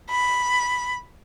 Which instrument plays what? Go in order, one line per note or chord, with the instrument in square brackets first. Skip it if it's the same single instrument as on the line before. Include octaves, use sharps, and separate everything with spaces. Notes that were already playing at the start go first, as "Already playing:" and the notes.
[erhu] B5